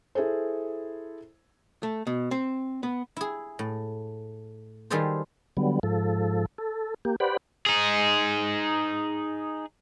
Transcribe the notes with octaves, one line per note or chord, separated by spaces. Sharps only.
E4 G#4 A4 C5
A3
B2
C4
B3
E4 G#4
A2
D#3 G3 F4 G#4 A4 C5
D3 F#3 G3 B3
G#2 F3 A4
A4
A#3 G4
G4 B4 C5 D5 F#5 B5
D#4 G#4